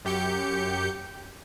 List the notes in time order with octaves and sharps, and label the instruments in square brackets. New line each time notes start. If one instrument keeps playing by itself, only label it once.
[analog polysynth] F#2 G4 G6 C#7